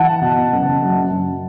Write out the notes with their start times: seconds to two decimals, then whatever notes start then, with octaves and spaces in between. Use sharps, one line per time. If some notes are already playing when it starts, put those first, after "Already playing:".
Already playing: E3 F#5 A5
0.21 B2
0.52 F#1
0.82 F#2
1.11 F#2